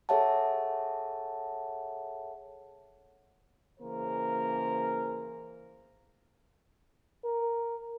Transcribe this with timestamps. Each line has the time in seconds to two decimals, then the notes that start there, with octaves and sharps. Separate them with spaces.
0.09 G#4 A4 C#5 E5 F#5 A5
3.80 C#3 E3 A#3 G#4 A#4 C5
7.24 A#4